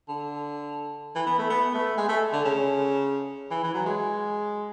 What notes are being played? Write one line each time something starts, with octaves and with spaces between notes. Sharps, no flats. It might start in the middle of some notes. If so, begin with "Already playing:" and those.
D3
E3
B3
A3
B3
A3
G#3
A3
D3
C#3
E3
E3
F#3
G#3